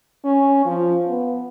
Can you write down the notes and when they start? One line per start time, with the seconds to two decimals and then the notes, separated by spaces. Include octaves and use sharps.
0.25 C#4
0.65 F3
1.07 B3